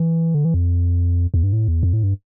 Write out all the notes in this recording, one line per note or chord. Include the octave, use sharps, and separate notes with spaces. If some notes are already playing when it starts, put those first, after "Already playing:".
Already playing: E3
D3
E3
F2
E2
G2
A2
E2
F2
A2
G2